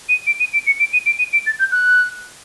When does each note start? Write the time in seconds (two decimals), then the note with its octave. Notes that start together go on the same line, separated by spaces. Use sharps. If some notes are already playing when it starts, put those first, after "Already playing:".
0.09 D#7
0.27 D7
0.40 D#7
0.53 D7
0.67 C#7
0.79 D7
0.93 D#7
1.06 D7
1.19 D#7
1.33 D7
1.46 A6
1.59 G6
1.72 F#6